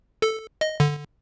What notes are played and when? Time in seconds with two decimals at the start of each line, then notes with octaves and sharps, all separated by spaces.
0.22 A4
0.61 D#5
0.80 D3